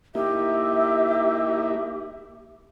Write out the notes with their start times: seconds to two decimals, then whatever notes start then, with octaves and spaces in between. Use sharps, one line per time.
0.15 A#3 D#4 E4 G4 E5